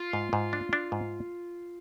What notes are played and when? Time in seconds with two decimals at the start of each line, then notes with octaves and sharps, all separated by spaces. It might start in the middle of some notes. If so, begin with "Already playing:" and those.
Already playing: F4
0.13 G#2
0.33 G#2
0.53 D4
0.73 D4
0.92 G#2